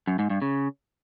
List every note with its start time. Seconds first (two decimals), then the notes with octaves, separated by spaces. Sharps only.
0.07 F#2
0.19 G#2
0.30 G2
0.42 C#3